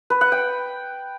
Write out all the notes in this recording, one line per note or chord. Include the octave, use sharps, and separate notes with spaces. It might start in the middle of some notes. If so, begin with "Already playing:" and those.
B4
F#5
G5